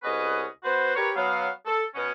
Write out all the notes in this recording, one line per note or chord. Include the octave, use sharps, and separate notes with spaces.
C2 B3 C#4 G#4 B4 D#5
B3 F#4 B4 C5
G4 A#4 B4 C#5
F#3 B3 F5
A4
B2 C#4